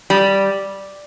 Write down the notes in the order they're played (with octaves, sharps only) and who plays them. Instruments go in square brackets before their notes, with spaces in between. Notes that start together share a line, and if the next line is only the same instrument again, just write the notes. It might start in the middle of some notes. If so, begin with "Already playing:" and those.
[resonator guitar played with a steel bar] G3